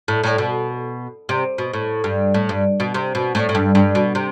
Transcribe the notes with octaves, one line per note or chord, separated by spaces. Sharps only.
A2
A2
B2
C3
B2
A2
G2
A2
G2
B2
C3
B2
A2
A2
G2
G2
B2
C3